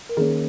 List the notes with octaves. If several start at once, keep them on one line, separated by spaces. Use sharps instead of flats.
A#4
D#3 A#3 C#4 G#4